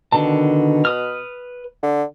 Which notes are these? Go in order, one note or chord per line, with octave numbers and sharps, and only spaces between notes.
B2 D3 D#3 A5
B4 D#6 F6
D3